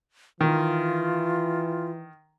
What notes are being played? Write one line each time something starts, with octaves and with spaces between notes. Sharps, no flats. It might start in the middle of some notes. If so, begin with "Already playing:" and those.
D#3 E3 F4